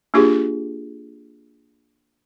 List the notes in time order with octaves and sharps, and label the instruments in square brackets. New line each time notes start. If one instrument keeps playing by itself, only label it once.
[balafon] A#3 D4 F4 G4 G#4